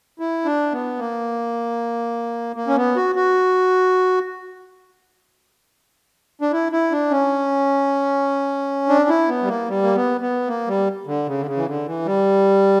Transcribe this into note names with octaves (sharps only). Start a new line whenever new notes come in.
E4
D4
B3
A#3
A#3
C#4
B3
F#4
F#4
D4
E4
E4
D4
C#4
D4
E4
B3
G3
A#3
G3
A#3
B3
B3
A#3
G3
D3
C#3
D3
C#3
E3
D3
E3
G3